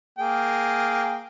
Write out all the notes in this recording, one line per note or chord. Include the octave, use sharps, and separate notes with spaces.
A#3 G#4 G5